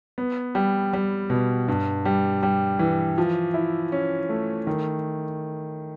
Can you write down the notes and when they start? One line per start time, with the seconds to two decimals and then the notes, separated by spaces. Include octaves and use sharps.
0.18 B3
0.55 G3
0.93 G3
1.30 B2
1.68 G2
2.05 G3
2.43 G3
2.79 E3
3.18 F3
3.54 E4
3.92 C#4
4.29 A3
4.67 D#3